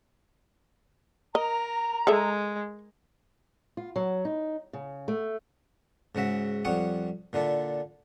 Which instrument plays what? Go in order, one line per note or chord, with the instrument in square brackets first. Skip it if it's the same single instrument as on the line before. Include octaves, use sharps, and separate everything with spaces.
[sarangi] A#4 [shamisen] D#5 [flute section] A#5
[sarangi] G#3 [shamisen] G#4 A4 E5
[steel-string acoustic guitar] F4
F#3
D#4
C#3
A3
[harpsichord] G#2 C#3 F#4 E5
F2 G3 C#5 F#5 D#6
A#2 D3 D4 E4